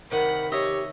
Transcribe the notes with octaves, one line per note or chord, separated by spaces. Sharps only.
C3 D#3 A#4 F#5 B5
G4 C#5 D#5 E5